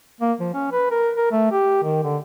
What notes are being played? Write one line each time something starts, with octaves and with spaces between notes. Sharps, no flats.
A#3
F3
C#4
B4
A#4
A#4
A3
G4
D#3
D3